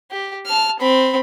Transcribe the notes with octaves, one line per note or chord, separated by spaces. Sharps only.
G4
A5 F6
C4 B5